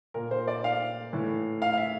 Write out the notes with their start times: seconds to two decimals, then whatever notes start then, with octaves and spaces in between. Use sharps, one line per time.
0.14 A#2 A#4
0.31 C5
0.48 D5
0.64 F5
1.13 A2 E3
1.62 F5
1.73 F5
1.77 E5